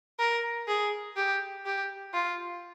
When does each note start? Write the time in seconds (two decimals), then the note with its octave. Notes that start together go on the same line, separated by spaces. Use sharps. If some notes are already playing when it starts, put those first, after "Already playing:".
0.19 A#4
0.68 G#4
1.16 G4
1.66 G4
2.13 F4